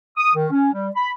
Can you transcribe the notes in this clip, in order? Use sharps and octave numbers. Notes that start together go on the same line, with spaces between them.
D#6
D#3
C#4
G3
B5